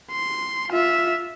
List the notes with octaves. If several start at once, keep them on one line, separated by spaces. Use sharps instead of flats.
C6
F4 E5